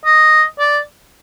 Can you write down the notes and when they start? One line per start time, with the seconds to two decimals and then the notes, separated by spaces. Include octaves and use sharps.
0.05 D#5
0.59 D5